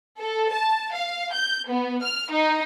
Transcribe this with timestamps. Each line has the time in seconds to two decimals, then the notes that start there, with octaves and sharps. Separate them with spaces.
0.19 A4
0.53 A5
0.93 F5
1.33 G6
1.68 B3
2.02 F6
2.31 D#4